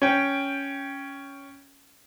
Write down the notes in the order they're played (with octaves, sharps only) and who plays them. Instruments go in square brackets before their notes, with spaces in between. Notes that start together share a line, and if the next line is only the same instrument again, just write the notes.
[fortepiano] C#4 G5